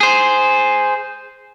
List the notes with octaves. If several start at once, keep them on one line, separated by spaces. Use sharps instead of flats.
G#4 C5